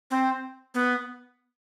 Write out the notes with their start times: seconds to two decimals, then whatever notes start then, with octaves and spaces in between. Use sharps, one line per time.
0.11 C4
0.74 B3